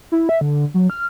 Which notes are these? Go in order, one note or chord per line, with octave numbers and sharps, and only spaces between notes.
E4
E5
D3
F#3
F6